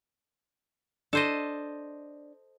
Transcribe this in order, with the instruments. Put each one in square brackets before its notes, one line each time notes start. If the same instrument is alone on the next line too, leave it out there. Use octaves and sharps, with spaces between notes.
[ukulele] D4 [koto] A4 C5 D#5